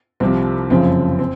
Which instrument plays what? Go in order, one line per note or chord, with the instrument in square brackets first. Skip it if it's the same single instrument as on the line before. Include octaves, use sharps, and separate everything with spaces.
[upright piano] C2 C3 F3 C4
F#1 F2 C#3 F3 C4
C4